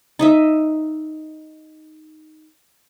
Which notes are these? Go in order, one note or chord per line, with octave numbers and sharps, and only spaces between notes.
D#4 D#5 E5